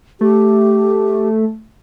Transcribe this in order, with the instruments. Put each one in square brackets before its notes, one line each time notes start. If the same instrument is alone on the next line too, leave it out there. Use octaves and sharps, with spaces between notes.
[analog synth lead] A3 [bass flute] G4